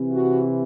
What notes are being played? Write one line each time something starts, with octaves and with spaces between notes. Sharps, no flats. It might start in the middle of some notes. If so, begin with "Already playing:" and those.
Already playing: C3 E3
F#4